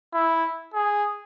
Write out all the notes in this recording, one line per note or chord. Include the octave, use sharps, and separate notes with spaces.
E4
G#4